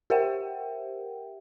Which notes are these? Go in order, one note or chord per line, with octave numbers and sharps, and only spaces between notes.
G4 A#4 C5 E5 F#5 G5